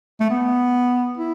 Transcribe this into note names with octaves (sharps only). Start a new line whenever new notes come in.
A3
B3
E4